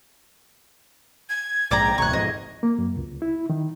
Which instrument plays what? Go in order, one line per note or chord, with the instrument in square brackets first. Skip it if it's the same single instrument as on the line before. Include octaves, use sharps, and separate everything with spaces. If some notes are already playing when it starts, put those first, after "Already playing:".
[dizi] G#6
[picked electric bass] A#1 G#2 [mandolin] D5 G5 A#5 [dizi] G#6
[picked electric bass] D1 A1 C3 [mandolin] C#6 F#6
[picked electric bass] F2 G#2 B2 [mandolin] D#5
[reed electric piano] A#3
F#2
C#2
E4
D#3